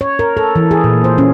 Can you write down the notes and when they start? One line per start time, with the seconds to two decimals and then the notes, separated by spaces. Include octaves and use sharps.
0.01 C#5
0.19 A#4
0.37 A4
0.56 E3
0.71 G#4
0.84 A#2
1.04 C5
1.18 C#4